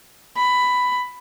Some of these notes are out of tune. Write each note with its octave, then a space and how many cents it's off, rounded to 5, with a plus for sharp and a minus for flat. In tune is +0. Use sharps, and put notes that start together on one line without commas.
B5 +10